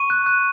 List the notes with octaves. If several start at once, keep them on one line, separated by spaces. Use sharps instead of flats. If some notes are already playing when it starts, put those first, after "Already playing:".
Already playing: C#6 D#7
F#6
F#6